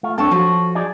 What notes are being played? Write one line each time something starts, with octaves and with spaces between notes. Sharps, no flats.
A3 F4
C4 D4 A4 C#5 A5
F3 F#4
D#4 G#4 D5